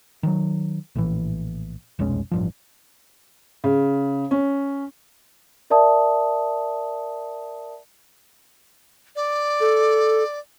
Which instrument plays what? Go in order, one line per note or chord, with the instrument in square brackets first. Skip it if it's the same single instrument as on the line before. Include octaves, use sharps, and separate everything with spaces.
[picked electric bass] D#3 E3 F#3
A#1 A2 E3
F1 B1 G#3 C#4
A1 G2 F3
[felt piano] C#3
C#4
[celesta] A#4 D5 E5 A5 D#6
[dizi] D5
[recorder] A4